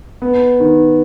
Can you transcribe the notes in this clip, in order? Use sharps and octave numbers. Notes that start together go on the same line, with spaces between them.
B3
D#3